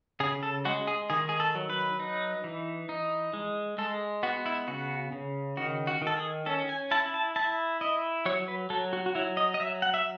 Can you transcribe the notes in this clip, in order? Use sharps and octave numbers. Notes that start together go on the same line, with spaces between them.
C#3 G#4
A4
G#3 F#4
G#4
D#3 G#4
G#4
A4
F#3
B4
D#4
E3
D#4
G#3
G#3 A4
B3 F#4
E4
C#3 F#4
C#3
D#3 F#4
F#4
D#3
A4
G#4
C#4 A4
G#5
E4 A5
A5
E4 A5
E4 D#5
F#3 C#5
B4
F#3 A4
F#4
F#4
F#3 E4
D#5
D#5
F#3 E5
F#5
E5